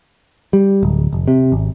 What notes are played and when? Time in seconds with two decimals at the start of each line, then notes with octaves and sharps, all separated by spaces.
0.53 G3
0.83 D1
1.13 F1
1.28 C3
1.52 G#1